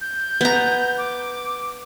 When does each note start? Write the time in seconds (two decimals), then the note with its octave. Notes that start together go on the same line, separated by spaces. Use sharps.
0.01 G6
0.41 B3 A#5
0.98 D6